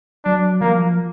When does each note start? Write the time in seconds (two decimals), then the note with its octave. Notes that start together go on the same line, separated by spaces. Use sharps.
0.25 F#3 D4
0.61 F3 A#3